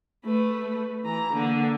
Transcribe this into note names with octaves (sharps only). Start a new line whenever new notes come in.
A3 B4
E3 A#5
D3 A#3